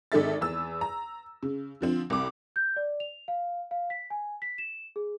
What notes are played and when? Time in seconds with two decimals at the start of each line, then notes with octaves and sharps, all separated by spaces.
0.12 G#1 D#3 G#3 A4 E5 A6
0.41 E2 E6
0.81 A#5
1.43 C#3
1.81 D3 F3 C4
2.10 C2 D6
2.56 G6
2.76 D5
3.00 F7
3.28 F5
3.71 F5
3.90 B6
4.10 G#5
4.42 B6
4.58 E7
4.96 G#4